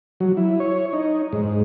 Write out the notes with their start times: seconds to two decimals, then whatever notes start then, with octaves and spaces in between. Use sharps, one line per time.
0.20 F#3
0.37 E4
0.60 C#5
0.93 D#4
1.33 G#2